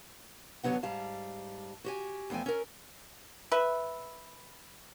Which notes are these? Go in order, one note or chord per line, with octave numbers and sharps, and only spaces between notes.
G2 D3 F#3 B3 D#4 F#5
G#2 G3 F5 A5
F#4 G4 G#5
E2 F3 A3 G5 G#5
C#4 A#4
B4 E5